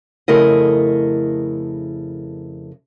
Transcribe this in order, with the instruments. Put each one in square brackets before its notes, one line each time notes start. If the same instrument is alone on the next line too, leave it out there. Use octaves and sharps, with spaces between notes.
[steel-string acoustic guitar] F2 C#3 A3 E4 A#4 D#5